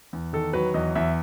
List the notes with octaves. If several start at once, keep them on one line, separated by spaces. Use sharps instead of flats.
E2
D#3 A4
F#3 B4
E2 D#5
E2 E5